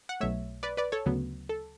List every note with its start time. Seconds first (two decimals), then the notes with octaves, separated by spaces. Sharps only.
0.09 F#5
0.20 B1 B2 A3 C#5 E5
0.63 B4 D5
0.77 B4 D5
0.92 A4 C#5
1.06 D2 C#3 F#3 B3
1.49 A4